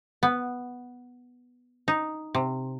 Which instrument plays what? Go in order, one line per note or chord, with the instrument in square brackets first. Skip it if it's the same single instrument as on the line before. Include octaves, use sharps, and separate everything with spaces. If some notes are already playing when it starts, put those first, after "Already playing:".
[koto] B3
D#4
C3